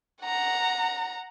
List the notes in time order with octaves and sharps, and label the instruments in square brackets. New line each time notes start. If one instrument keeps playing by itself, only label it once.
[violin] F#5 A#5